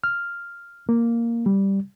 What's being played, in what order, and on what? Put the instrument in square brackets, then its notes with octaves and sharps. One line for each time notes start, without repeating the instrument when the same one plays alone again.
[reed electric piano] F6
A#3
G3